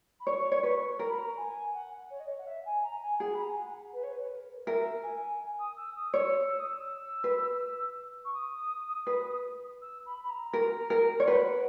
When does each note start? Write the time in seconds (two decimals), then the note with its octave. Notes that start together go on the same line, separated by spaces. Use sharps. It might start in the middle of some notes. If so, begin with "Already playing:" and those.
0.19 B5
0.26 C#5 C#6
0.52 C#5
0.63 B4
0.99 A#4 A#5
1.08 B5
1.16 A#5
1.37 G#5
1.73 F#5
2.10 C#5
2.19 D#5
2.28 C#5
2.38 F#5
2.47 E5
2.65 G#5
2.83 A#5
3.01 G#5
3.20 G#4 F#5
3.34 B5
3.41 A#5
3.49 G#5
3.57 F#5
3.93 B4
4.03 C#5
4.12 B4
4.30 A#4
4.66 A#4 E5
5.03 G#5
5.40 G#5
5.59 D#6
5.77 E6
5.95 D#6
6.13 C#5 E6
6.50 E6
6.59 D#6
6.67 E6
7.24 B4
8.25 C#6
8.33 D#6
9.07 B4
9.81 E6
10.05 B5
10.23 B5
10.29 A#5
10.53 A#4
10.90 A#4
11.20 C#5
11.27 B4 F#5